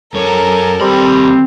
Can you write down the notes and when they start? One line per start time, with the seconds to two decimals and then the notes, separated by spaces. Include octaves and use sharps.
0.14 F#2 A4 A#4 C#5
0.81 D#2 G3 C4 B5